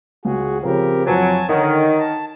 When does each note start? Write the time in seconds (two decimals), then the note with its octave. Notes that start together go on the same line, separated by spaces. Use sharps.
0.25 C#2 F#4 G#4
0.63 C#3 F3 C4 G4 A#4
1.07 F#2 F3 F#3 C4 G#5 A5
1.49 D3 D#3 D#4 C#5 F#5
1.99 A5